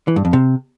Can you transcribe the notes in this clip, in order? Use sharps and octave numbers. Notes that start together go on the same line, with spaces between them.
E3
G2
F2
C3